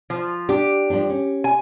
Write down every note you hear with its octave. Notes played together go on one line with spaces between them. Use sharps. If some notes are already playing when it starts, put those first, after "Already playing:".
F3
D4 G4
F3 G3 D4
C#4
G#5